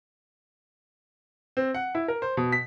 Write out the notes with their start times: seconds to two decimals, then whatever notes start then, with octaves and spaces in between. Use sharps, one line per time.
1.57 C4
1.74 F#5
1.95 E4
2.08 A#4
2.22 C5
2.37 B2
2.52 B6